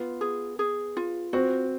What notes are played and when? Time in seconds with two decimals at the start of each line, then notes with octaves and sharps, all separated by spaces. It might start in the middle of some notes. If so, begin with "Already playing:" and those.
Already playing: B3 F4
0.21 G#4
0.59 G#4
0.97 F4
1.33 C4 F#4